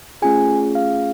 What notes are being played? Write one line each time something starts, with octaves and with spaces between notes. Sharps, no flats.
A3 C#4 F4 G#4 G#5
F5